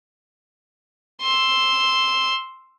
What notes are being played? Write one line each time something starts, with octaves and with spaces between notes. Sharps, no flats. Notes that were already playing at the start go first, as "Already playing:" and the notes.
C6 E6